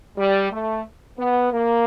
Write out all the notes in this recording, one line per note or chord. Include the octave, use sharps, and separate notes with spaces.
G3
A3
B3
A#3